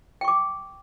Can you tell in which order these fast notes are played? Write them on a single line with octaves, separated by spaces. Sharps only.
G5 C#6 D6